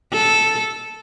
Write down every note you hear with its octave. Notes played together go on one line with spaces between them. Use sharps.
A4